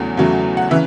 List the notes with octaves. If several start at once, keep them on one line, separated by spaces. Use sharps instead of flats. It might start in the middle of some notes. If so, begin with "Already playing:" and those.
Already playing: E2 C#3 F#3 A3
E2 C#3 F#3 A3
F#5
C#3 E3 E5